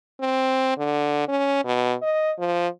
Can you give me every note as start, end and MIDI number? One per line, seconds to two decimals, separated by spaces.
0.20 0.75 60
0.78 1.28 50
1.28 1.63 61
1.65 1.95 47
2.02 2.32 75
2.39 2.68 53